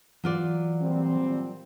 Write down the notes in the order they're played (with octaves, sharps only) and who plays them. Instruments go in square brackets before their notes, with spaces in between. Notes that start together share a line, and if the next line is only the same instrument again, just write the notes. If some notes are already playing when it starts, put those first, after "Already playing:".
[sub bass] E3 [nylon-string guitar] F#3 F4 D5
[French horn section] A#2 G3 C4